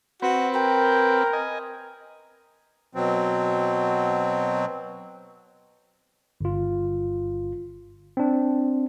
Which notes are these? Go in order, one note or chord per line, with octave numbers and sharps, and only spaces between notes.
C4 F#4 B4
A#4 G5
D#5 G#5
B2 F#3 C4
G1 F4
C4 D4